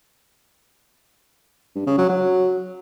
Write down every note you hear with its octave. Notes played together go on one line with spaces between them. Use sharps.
G2
C#3
F#3
F#3